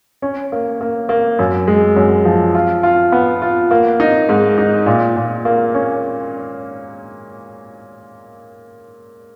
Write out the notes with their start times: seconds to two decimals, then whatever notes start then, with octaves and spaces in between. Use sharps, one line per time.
0.22 C#4
0.52 A#3
0.81 A#3
1.09 A#3
1.39 F#2
1.68 G#3
1.96 F#2
2.25 F3
2.55 F4
2.83 F4
3.12 B3
3.42 F4
3.71 A#3
4.00 D#4
4.29 G#2
4.58 D#4
4.86 A#2
5.16 A#2
5.45 A#3
5.74 C#4